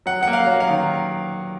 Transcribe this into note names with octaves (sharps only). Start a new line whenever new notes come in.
F#3 F#5
A#3 F#5
F5
F#3
F5
D#3